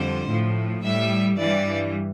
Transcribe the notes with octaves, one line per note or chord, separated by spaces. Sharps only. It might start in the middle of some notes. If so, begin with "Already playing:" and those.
Already playing: F2 D3 G3 C5
A2 F3
A2 G3 E5
G2 E3 G3 D5